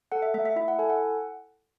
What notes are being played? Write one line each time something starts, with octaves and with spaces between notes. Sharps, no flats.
A4 F#5
E5
A3 E5
E5
E4 E5
F#5
A4 G#5
F#5